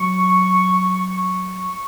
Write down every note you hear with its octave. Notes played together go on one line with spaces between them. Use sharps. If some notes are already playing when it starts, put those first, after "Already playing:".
Already playing: F#3 C#6
C#6